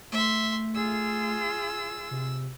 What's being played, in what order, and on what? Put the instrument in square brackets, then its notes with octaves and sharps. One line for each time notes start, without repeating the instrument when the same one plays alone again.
[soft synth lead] A3 [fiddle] E5 C6
[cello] F4 G#4 [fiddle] E6
[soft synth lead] C3